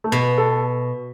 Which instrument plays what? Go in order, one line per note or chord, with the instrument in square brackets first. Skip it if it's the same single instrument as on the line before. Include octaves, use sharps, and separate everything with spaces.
[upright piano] A3
[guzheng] B2 [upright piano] B3
[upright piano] A4